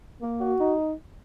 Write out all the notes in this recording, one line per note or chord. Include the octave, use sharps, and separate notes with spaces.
A#3
F#4
D#4